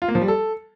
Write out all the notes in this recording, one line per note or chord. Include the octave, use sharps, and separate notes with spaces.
F4
A#3
F3
G3
A4